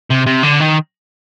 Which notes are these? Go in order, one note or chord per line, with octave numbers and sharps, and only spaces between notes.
C3
C3
D3
D#3